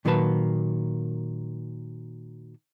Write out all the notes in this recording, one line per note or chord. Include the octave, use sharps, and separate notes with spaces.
A#2 D#3 F#3 A#3 B4 A5